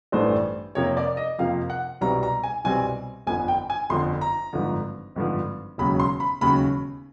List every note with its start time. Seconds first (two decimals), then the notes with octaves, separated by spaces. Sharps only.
0.12 A1 G2 E3 A3 D4 C5
0.75 F2 C3 F3 A#3 C#5
0.97 D5
1.17 D#5
1.38 F2 C3 F3 A#3 F5
1.70 F#5
2.01 C2 B2 G3 C4 A#5
2.23 A#5
2.43 G#5
2.64 C2 B2 G3 C4 G#5
3.27 G1 F2 D3 G#5
3.48 G5
3.70 G#5
3.90 G1 F2 D3 C6
4.21 A#5
4.53 G#1 G2 D3 F3
5.16 G#1 G2 D3 F3
5.78 E1 D#2 C#3 F#3 B5
6.00 C6
6.20 B5
6.41 E1 D#2 C#3 F#3 B5